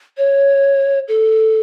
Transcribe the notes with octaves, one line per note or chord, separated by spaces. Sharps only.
C#5
A4